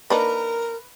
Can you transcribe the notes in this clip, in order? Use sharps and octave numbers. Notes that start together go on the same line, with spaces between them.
A#3 D4 D#4 A#4 B4